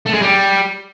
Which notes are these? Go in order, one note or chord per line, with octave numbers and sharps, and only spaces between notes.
A3
G#3
G3